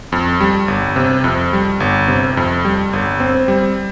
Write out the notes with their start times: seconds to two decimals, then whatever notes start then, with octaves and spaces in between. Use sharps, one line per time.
0.12 F2
0.40 G3
0.68 G1
0.96 C3
1.24 F2
1.53 G3
1.80 G1
2.08 C3
2.37 F2
2.65 G3
2.93 G1
3.20 C4
3.48 G3